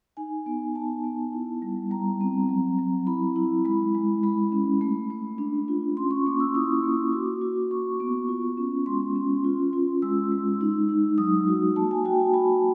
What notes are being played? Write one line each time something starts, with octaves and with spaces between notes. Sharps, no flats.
D#4 G#5
B3
B3 A5
B3
E4
G3
G3 A#5
C4
F#3
F#3
E4 B5
E4
G#3 B5
G#3
G#3 B5
C#4
A3
A3
D4
F4
C#4 C6
C#6
A#3 D6
E6
E4 D#6
A#3
F#4 D6
F#4
F#4 C#6
B3
F4
C#4
G#3 C6
C#4
F4
F4
G#3 E6
G#3
D#4
D#4
F#3 D#6
F#4
A#3 A5
G#5
F#4 G5
A5
F#4 B5